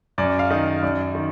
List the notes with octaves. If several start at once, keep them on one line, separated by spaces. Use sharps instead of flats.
F#2 D5
F5
D#3 D#5
F#2 D5
D#3